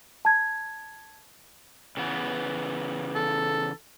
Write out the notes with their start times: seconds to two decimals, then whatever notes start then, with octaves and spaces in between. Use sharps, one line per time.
0.25 A5 G#6
1.97 C#3 E3 B3
3.15 A4